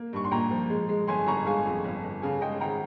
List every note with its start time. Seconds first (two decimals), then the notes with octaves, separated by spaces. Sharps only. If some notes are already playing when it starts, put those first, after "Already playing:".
Already playing: A#3
0.13 G2 C#6
0.24 C6
0.31 A#2 G5 A#5
0.51 F3
0.70 G#3
0.89 G#3
1.07 G1 G#5 C6
1.27 G1 A#5 C#6
1.46 G#3 F5 G#5
1.66 F2
1.84 G1
2.04 G1
2.22 C#3 F5 G#5
2.41 G#3 D#5 G5
2.60 G#1 G5 A#5